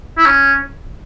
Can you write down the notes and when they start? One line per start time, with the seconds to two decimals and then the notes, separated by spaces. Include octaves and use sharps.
0.18 E4
0.26 C#4